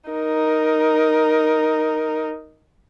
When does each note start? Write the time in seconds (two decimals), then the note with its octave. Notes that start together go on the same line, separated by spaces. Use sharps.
0.10 D#4 A#4